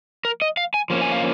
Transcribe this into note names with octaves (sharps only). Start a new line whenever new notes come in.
A#4
D#5
F5
G#5
F3 A#3 C#4
G#5
F5